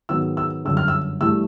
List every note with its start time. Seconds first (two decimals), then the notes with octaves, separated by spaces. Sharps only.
0.09 G#2 D#3 F#3 B3 E6
0.37 E6
0.65 G1 F#2 D3 E6
0.77 F6
0.88 E6
1.21 G2 E3 A3 E6